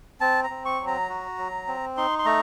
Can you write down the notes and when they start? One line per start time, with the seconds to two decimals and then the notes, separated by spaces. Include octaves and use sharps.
0.21 C4 A5
0.44 A#5
0.50 C4
0.65 C#6
0.80 F#3
0.87 A#5
1.09 F#4
1.38 F#3
1.68 C4
1.97 D#4 C6
2.19 C6
2.25 A3 A#5